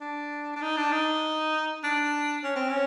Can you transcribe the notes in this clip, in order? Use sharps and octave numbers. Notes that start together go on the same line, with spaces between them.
D4
D4
D#4
D4
D#4
D4
C#4
C4
C#4